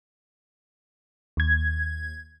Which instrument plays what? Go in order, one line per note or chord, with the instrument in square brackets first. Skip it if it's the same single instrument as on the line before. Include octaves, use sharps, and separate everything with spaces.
[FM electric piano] D#2 G#6